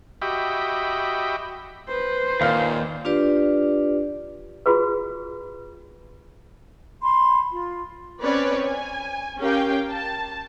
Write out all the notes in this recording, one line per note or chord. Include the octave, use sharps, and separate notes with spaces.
F#4 G4 D#5 E5 G5 B5
B4 C5
D#2 A#2 F5 F6
D4 F4 G4 B4 D5
F4 F#4 G#4 B4
B5 C6
F4
C4 C#4 B4 C#5 D5
G#5
C#4 G4 A#4 F5 G5
A5